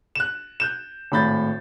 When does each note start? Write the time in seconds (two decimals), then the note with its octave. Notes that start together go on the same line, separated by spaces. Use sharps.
0.15 F#6 E7
0.60 F#6 G6 E7
1.12 G#1 A2 B5 G6 A6